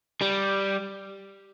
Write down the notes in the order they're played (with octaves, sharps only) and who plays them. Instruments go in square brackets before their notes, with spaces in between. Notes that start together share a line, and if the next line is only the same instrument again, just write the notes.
[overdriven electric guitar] G3